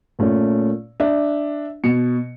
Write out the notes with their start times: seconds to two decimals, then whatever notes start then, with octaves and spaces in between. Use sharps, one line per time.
0.19 A#2 A3 C#4
1.00 D4 E5
1.84 B2 C#7